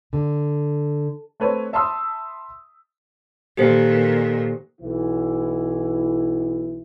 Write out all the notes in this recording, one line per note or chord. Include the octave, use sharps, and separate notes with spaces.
D3
A3 C4 B4 C#5
E5 A5 B5 C6 D#6 E6
A#2 D#3 G4 A4 C5
B1 E3 E4